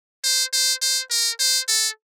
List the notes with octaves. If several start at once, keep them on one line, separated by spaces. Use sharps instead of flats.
C5
C5
C5
A#4
C5
A4